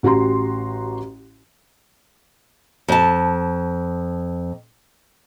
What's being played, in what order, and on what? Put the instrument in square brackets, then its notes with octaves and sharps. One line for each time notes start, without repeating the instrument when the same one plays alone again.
[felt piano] A1 F#4 G4 A#5 C6
[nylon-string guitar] F2 A5